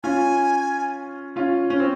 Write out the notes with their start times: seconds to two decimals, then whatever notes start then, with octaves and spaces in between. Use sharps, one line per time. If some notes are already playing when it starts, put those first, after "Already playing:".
0.03 C#4 F4 G#5
1.36 C#4 F4
1.70 C#4
1.80 C4